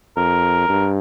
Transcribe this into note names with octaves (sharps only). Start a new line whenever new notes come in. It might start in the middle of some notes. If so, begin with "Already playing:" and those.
F2 A#4
G2